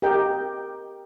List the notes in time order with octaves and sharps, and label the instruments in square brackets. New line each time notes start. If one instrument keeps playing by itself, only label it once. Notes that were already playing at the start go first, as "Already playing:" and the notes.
[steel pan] G4 A#4 D#5 G5